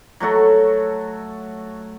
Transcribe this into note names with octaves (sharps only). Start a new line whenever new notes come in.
F#3 A3 F#4 A4